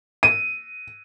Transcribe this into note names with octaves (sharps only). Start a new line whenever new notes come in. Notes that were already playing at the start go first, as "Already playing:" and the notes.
D#7